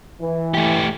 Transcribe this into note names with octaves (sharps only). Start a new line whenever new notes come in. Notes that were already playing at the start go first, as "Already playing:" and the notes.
E3
A3 G4